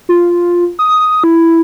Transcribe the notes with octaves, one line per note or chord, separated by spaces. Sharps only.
F4
D#6
E4